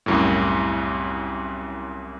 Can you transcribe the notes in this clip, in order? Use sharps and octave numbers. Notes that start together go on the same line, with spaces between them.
C2 F#2 A2